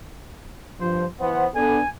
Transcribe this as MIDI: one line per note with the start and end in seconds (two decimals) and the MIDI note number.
0.81 1.05 43
0.81 1.05 53
0.81 1.06 72
1.20 1.46 52
1.20 1.48 59
1.20 1.46 72
1.20 1.46 78
1.55 1.80 59
1.55 1.80 62
1.55 1.80 69
1.55 1.89 80